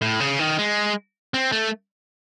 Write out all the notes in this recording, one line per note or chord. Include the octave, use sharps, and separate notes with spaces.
A2
C#3
D#3
G#3
C4
A3